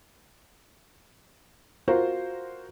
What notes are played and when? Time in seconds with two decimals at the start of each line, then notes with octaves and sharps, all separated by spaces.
1.88 F4 F#4 A#4 C5